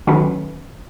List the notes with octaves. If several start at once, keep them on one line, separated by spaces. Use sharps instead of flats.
D#3 F#3 A3 C#4 B4